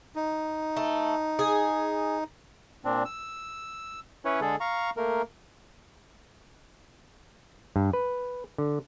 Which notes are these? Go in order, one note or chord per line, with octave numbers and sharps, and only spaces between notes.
D#4
A3
G#4
A#2 C4 D4
E6
C#4 E4 B4 C#5
D3 G#3 G#4 A4
F5 A#5 C#6
A3 A#3 A#4
G2
B4
D3